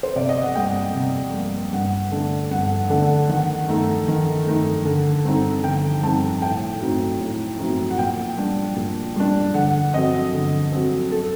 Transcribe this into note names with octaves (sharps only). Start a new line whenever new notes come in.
C5
C3 D5
D#5
F#5
G3 A#3 G5
C3
G3 A#3
G2 F#5
D3 A3 D4
G2 F#5
D3 A3 D4 F#5
D#3 F#5
A3 D#4
D#3
A3 D#4
D3
G3 C4 D#4
D3 G5
G3 C4 D#4 A5
A2 G5
F#3 A3 C4 D#4
A2
F#3 A3 C4 D#4
F#5
A#2 G5
G3 D4
A#2
G3 D4
D3 F#5
F#3 C4 D#5
D3
F#3 C4
A4